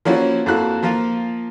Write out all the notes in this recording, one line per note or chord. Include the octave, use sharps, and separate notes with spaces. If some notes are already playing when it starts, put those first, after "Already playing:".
F3 A#3 C#4 E4 F#4
F2 A#3 E4 F#4 F#6
F3 A#3 F4